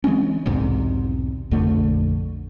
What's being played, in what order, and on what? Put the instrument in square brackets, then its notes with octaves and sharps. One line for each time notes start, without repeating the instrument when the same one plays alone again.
[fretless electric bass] E3 G#3 C4 C#4
B1 E2 G#2 C3
A#1 F2 D3 A3